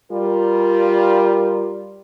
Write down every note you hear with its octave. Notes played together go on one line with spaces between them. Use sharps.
G3 F4 A#4